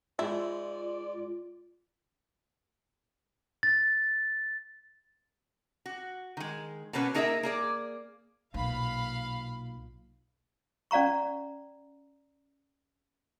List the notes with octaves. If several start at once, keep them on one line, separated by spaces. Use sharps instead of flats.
G#2 E4 F4 D5
A6
F#4
D#3 G#3
B2 A#3 B3 C#4 B4
A#3 D#4 G#4 A#4 D#5 E5
A#3 G#4 D5
B1 A#2 F5 B5
C#4 D5 F5 A#5 C#6